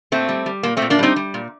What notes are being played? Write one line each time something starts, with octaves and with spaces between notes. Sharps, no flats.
A#2 A3 C4
G3
G3
A#2 A#3
A3 C4
A#2
A#3 D4
G3 C4 D#4
G3
A#2